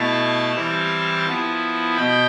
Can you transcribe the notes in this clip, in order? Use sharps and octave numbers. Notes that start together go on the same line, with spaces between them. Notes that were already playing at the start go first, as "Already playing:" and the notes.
Already playing: B2 A3 E4 F5 A5
E3 G3 C4 E4
F3 B3 E4
B2 G5 B5